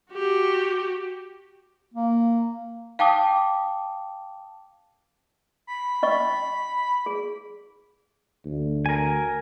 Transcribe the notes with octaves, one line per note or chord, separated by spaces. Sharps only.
F#4 G4
A#3
F5 G5 A5 D6 D#6
B5
C#4 D#5 C#6
G#4
D2
A#4 G#5